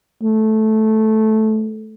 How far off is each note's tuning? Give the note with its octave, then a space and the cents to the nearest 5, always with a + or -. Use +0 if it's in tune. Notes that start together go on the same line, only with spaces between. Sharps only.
A3 -10